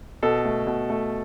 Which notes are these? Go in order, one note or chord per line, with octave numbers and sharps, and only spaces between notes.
B2 A4
A3
B2
A3